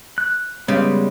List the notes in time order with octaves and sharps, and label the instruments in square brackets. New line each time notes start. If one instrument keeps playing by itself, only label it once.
[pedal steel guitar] F#6
[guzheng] C#3 G4 [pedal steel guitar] G3 G#3 B3